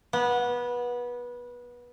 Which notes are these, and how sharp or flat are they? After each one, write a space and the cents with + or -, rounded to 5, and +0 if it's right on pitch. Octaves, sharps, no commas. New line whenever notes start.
B3 -20